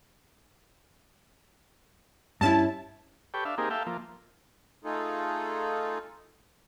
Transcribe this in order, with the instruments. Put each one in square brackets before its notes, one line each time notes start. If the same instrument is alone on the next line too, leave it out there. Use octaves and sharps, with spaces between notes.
[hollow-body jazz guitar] G2 C#4 E4 [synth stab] A5
[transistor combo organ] G4 A4 B4 C#5 G5
D4 E5 F5
A#3 C4 D#4 G4 G#4 A#4
A4 E5 F5 G5
F3 A#3
[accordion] A3 D#4 F4 G#4 A4